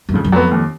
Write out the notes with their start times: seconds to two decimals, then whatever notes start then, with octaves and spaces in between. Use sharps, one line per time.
0.09 F#2
0.14 F2 C#3
0.25 F#2
0.32 F2 F#3 B3
0.51 D#2